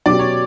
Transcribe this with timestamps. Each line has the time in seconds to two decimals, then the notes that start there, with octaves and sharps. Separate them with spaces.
0.06 B2 F#3 C#4 G4 D5
0.19 C#5